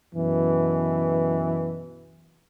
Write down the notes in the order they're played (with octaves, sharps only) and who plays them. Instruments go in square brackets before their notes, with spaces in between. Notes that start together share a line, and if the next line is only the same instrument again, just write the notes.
[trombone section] F#2 B2 E3